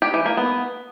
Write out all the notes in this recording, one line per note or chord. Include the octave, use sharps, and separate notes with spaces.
G4
E3
A#3
B3